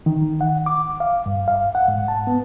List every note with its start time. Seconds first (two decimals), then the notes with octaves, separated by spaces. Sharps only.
0.06 D#3
0.41 F#5
0.66 D6
1.00 F5
1.26 G2
1.48 F5
1.75 F#5
1.88 G#2
2.08 A5
2.27 B3